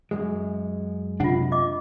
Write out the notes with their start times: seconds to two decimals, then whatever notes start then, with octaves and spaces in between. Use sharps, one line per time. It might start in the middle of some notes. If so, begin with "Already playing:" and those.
0.11 F#2 G#3
1.20 C3 D4 F4 F#5
1.52 D#5 D6